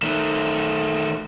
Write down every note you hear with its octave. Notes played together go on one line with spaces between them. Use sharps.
D#3 A3